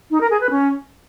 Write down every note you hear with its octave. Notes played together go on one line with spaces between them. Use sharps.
D#4
A#4
G#4
B4
C#4